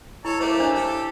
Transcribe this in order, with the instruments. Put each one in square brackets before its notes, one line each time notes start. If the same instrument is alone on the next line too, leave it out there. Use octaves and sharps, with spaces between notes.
[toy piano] E4 [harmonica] A4 C#5
[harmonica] A3 A#3 G4 [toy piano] C5
[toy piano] D4 C#5
[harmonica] G4 A4